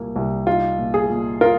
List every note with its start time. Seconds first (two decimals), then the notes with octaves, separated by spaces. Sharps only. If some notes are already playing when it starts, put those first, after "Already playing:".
Already playing: C2 A#2 A#3
0.16 C2
0.47 D#4 F4
0.79 A#2
0.94 G#4
1.10 A#2
1.41 A#3 F4 A#4